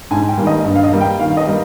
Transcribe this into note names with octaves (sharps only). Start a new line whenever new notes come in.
G#2 G#5
G5
D#3 G3 A#3
D#5
G2
F5
D#5
G3 A#3
G5
D#3 F5
D#5
G3 A#3